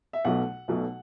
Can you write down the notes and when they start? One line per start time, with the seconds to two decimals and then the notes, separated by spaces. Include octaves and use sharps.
0.13 E5
0.25 B1 B2 F#3 A3 F#5
0.68 B1 B2 F#3 A3